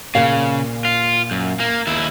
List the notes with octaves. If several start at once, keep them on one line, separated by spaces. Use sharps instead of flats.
A#2 C#3 A#4 F5
F4
F#2
A#3
D#2 E4